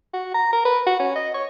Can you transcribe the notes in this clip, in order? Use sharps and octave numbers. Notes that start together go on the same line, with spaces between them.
F#4
A#5
A#4
B4
F#4
C#4
D#5
C#5